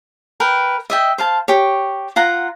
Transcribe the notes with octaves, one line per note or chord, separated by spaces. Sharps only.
A#4 B4 G5
D#5 E5 G5
C5 F5 A5
G4 C#5
F4 F#5 A#5